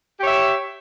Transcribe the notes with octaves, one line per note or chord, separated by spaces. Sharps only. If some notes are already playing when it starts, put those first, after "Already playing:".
G4 C#5 E5